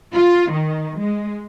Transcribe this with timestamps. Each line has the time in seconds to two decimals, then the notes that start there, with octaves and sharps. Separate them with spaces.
0.13 F4
0.52 D#3
0.99 G#3